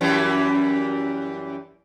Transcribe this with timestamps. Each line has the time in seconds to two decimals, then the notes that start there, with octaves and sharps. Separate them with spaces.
0.01 F#2 E3 G3